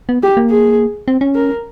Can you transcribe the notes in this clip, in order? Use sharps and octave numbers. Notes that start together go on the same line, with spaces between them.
B3
G4
A#3
G#4
C4
C#4
A#4